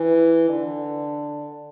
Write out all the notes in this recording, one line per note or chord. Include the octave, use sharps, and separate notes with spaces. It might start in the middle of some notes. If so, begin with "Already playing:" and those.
Already playing: E3
D3